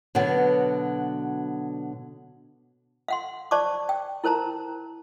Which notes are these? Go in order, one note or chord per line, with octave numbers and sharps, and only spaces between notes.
B2 D3 F#3 B3
F5 F#5 C6
C5 D5 A5 C#6 D6
G5
E4 A#4 C5 A5 A#5